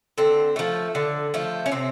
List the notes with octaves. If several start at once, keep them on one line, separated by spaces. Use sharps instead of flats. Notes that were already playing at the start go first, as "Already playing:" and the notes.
D3 C4
F3 A3
D3
F3 A3
C#4
C3 C4